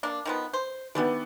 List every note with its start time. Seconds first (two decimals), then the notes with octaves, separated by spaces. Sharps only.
0.03 A#3 D4
0.25 D#3 F3 B3
0.53 C5
0.95 D#3 E3 G3 B3 D4